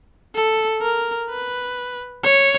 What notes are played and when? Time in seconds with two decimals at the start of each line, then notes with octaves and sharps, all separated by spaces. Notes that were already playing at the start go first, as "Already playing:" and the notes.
0.35 A4
0.82 A#4
1.30 B4
2.23 C#5